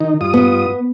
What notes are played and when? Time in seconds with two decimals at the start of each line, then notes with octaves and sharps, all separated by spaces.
0.01 D#3 D#4
0.21 G2 F4 D#6
0.34 B3